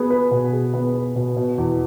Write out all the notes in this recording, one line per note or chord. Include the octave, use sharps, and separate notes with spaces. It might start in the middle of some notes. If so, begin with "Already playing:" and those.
Already playing: B3 G#4
B4
B2
G#4
B3
B4
B2
B2
E2